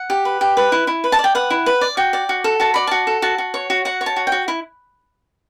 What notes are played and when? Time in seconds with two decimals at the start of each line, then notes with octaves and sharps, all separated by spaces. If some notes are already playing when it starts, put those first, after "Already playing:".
Already playing: F#5
0.10 G4
0.25 B4
0.41 G4
0.57 B4
0.72 E4
0.87 E4
1.04 B4
1.12 A5
1.19 D5
1.24 G5
1.35 B4 F#5
1.50 E4
1.66 B4
1.81 D5
1.97 F#4 G5
2.13 D5
2.29 F#4
2.44 A4
2.60 F#4 A5
2.74 D5 B5
2.87 F#4 A5
3.07 A4
3.22 F#4 A5
3.38 F#4
3.54 C#5
3.70 F#4
3.85 F#4 F#5
4.01 C#5
4.06 A5
4.16 F#4
4.27 F#4 G5
4.48 E4